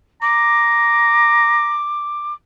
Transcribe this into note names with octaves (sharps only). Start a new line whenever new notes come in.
A#5 D6